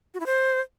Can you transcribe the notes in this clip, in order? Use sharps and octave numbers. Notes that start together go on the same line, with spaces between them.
F#4
E4
C5